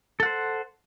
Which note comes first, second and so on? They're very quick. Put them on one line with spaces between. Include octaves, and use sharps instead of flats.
A4 F#5 C5